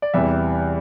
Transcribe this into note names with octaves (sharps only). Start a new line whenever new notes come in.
D5
E2 C3 E3 G3 E5